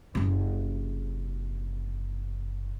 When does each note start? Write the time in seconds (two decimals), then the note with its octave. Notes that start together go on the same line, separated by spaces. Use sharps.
0.15 F#1 C3